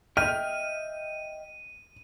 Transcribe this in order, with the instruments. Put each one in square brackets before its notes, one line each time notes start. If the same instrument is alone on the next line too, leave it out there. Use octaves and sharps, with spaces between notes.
[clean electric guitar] D#5 E5 G5 [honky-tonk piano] F6 [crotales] D#7